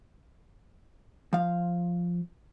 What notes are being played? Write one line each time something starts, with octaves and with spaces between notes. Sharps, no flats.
F3 F5